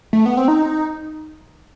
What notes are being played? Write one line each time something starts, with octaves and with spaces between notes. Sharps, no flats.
A3
B3
C4
D#4